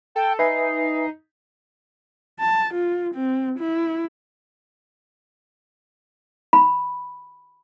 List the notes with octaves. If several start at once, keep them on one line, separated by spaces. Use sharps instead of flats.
A4 G5
D#4 B4 E5 G#5 C7
A5
F4
C4
E4
B5